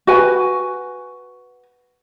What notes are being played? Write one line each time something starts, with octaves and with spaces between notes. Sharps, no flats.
F#4 B4 G#5